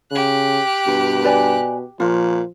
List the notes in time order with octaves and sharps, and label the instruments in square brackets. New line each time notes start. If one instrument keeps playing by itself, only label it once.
[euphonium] C#3 [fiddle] G4 F#6
[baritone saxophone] G2 [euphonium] B2
[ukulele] B4 D5 G#5
[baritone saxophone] A#2 [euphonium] F3 [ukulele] F4